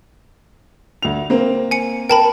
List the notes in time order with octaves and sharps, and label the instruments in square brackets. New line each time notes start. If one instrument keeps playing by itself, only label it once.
[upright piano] D2 F7
A#3 C4
[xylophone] G#5 C#7
[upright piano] A#4 [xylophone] G5 A5 B5